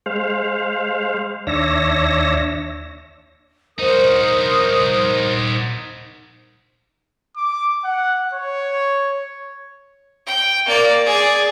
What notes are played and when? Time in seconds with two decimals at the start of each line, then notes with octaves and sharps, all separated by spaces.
0.06 G#3 C5 F5
1.47 D#2 D4 C#5 E5 A#6
3.79 D#4 F#4 A#4 C5 D#6
7.36 D6
7.84 F#5
8.33 C#5
10.26 G5
10.66 A#3 D5
11.06 G#4 D5